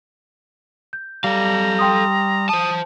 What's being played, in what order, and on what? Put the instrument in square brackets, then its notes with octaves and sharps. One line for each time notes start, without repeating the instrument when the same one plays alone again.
[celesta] G6
[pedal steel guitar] G3 [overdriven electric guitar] A4 F5 [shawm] A#5
[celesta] G5 C6 D#6
[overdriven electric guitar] C5 A5 [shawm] D#6